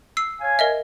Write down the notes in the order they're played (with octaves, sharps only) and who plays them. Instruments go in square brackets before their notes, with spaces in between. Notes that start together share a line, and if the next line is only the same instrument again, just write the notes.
[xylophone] E6 C7
[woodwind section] C#5 F5 G#5
[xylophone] A#4 D#5 E5